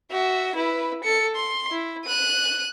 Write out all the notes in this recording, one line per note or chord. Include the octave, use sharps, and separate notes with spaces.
F#4 E5
E4 B4
A4 C#7
C6
E4
F#6 D#7